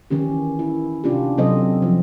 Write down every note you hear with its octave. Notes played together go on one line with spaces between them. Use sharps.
D#3 E3 C#4 G4
E4
C3 C#4 D4 F4 G4
C3 F#3 C4 A4 C5 D#5
F3